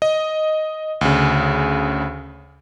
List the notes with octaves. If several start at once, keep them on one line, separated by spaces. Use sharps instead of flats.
D#5
D2 C#3